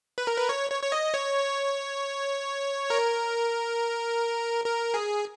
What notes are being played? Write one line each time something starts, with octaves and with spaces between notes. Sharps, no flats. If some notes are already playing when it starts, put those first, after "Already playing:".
B4
A#4
B4
C#5
C#5
C#5
D#5
C#5
A#4
A#4
G#4